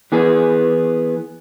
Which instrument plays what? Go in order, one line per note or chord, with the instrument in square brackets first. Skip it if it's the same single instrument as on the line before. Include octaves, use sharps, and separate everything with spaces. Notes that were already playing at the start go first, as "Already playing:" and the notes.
[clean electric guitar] E3 B3 G#4